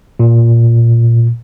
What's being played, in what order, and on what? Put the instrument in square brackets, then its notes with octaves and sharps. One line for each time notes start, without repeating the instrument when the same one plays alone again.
[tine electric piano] A#2